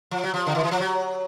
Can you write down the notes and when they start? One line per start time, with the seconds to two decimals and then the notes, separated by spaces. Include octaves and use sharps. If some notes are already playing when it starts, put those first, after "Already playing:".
0.11 F3
0.24 F#3
0.34 F3
0.46 D3
0.55 D#3
0.63 E3
0.71 F3
0.80 F#3